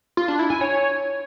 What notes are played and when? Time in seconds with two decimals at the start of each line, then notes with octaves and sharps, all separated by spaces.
0.17 F4
0.28 D4
0.39 E4
0.50 G#5
0.61 C#5